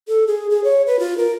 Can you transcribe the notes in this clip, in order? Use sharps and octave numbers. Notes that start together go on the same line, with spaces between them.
A4
G#4
G#4
C#5
B4
F4
A#4